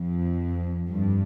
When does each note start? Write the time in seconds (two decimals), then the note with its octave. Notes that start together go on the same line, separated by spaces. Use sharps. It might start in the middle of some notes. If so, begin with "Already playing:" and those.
Already playing: F2
0.89 G2